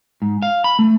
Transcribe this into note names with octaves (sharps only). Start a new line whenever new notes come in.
G#2
F5
B5
A3